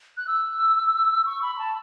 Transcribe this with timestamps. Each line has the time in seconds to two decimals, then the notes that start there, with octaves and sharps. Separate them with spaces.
0.17 F#6
0.27 E6
1.26 C#6
1.42 B5
1.55 B5
1.58 A5